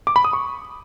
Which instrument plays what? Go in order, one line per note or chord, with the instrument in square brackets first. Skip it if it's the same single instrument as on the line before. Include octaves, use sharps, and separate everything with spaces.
[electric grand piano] D6
B5
D#6
C#6